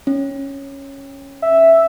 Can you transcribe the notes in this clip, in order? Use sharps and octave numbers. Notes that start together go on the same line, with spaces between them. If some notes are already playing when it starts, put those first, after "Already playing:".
C#4
E5